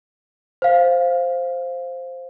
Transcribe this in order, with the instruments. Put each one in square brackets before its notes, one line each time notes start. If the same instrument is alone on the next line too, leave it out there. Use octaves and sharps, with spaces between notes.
[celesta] C5 F5